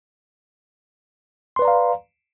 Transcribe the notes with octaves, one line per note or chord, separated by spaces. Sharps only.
B4 D5 F5 A#5 C6